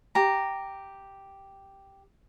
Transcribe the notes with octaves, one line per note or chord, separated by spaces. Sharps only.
G4 A#5